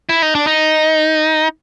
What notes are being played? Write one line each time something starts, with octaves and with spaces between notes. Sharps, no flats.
E4
D#4
D4
D#4